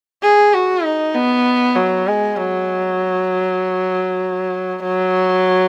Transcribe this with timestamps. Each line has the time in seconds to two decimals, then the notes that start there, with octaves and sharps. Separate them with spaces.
0.23 G#4
0.54 F#4
0.85 D#4
1.15 B3
1.76 F#3
2.07 G#3
2.37 F#3
4.83 F#3